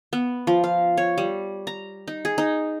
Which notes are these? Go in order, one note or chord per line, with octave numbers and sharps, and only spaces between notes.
B3
F3
F5
C#5
G3
A#5
D#4
G#4
D#4